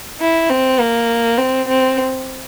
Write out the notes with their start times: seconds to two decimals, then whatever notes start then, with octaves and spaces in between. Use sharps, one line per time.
0.20 E4
0.49 C4
0.80 A#3
1.38 C4
1.68 C4